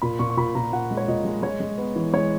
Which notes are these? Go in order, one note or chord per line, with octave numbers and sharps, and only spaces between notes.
A#2 B5
A#2 C#6
C#6
A#2 B5
A#2 A#5
A#2 F#5
G#3
C#5
A#2 D#5
G#3
G#3 C#5
G#3
B3
E3
G#3 C#5